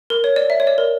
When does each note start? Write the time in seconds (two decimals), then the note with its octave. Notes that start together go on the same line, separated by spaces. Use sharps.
0.10 A#4
0.24 C#5
0.36 D5
0.50 E5
0.60 C#5
0.67 D5
0.78 A#4